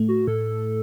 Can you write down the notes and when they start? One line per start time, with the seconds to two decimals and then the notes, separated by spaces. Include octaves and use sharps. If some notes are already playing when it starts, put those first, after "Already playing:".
Already playing: A2 A3
0.08 F#4
0.27 A2 A4